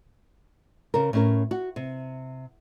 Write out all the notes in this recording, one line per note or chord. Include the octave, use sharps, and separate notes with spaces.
C#3 A#4
A2 C#4 A#4
F#4
C3